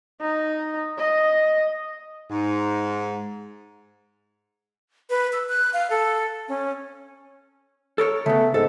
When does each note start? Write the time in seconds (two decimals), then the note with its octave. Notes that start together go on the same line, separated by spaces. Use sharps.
0.21 D#4
0.98 D#5
2.30 G#2
5.10 B4
5.33 E6
5.49 F#6
5.74 F5
5.90 A4
6.48 C#4
7.98 A4 A#4 C#5
8.26 C#3 A3 B3
8.54 G#2 A4